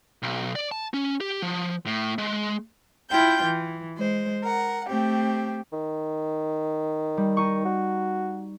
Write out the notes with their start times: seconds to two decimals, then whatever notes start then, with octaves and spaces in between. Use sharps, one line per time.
0.23 B1
0.55 D5
0.71 A5
0.94 C#4
1.21 G4
1.42 F3
1.86 A2
2.18 G#3
3.09 E4 F4 G5 G6
3.44 E3
3.97 G#3 C5
4.43 A#4 F#5
4.88 A3 C4 G4
5.73 D#3
7.17 G3
7.37 D#4 C#6
7.65 F#4